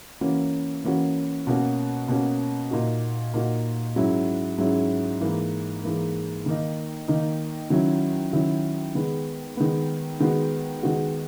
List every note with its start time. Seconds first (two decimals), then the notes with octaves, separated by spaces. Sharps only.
0.21 E3 A#3 C#4 F#4
0.84 E3 A#3 C#4 F#4
1.47 B2 A#3 C#4 F#4
2.08 B2 A#3 C#4 F#4
2.71 A#2 A#3 D#4 F#4
3.34 A#2 A#3 D#4 F#4
3.96 G#2 F#3 C#4 E4
4.58 G#2 F#3 C#4 E4
5.21 G#2 E3 A#3
5.83 G#2 E3 A#3
6.46 D#3 A#3 D#4
7.08 D#3 A#3 D#4
7.70 D#3 F#3 C#4 E4
8.33 D#3 F#3 C#4 E4
8.95 D#3 G#3 B3
9.57 D#3 G#3 B3
10.20 D#3 G#3 B3 F#4
10.83 D#3 G#3 B3 F#4